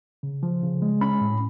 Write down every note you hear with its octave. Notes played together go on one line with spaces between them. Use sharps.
C#3
F3
C#3
G#3
C#4 B5
A2